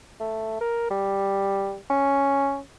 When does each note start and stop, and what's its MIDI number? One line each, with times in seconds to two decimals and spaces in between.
0.20 0.57 57
0.61 0.88 70
0.91 1.77 55
1.90 2.58 61